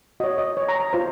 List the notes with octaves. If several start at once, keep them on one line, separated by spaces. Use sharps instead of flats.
F#4 C#5 D#5
D#5
C#5
A#5
A#5
F4 C5